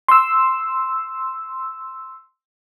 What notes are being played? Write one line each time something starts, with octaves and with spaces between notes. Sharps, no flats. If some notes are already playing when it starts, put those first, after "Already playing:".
C6 E6